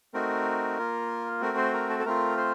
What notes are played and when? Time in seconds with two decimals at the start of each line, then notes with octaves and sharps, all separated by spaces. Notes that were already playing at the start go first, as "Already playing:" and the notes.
0.14 A3 C4 D#4 F#4 A#4
0.78 A#3 F4
1.41 A3 C4 F#4 A#4
1.58 C5
1.73 A#4
1.90 A4
2.00 A4
2.05 A3 C4 F4 A#4
2.37 C5